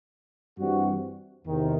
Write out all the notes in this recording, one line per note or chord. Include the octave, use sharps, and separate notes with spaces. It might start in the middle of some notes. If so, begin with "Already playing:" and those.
G2 E3 G3 C4 F#4
E2 C3 D#3